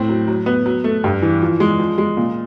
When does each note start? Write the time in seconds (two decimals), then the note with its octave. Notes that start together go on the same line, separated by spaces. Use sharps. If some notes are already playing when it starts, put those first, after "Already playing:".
Already playing: A2 C4
0.09 F#3
0.28 F#3
0.46 B3
0.66 F#3
0.84 A3
1.04 G2
1.22 E3
1.42 F3
1.60 G#3
1.79 F3
1.98 G#3
2.17 A#2